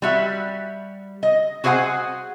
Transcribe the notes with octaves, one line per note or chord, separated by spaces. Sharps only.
G3 F#4 E5
D#5
F#4 G#4 C5 D#5 F#5 G#5